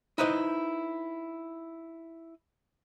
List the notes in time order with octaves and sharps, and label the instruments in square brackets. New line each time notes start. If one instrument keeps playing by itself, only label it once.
[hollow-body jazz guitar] D#4 E4 B4 C5 D#5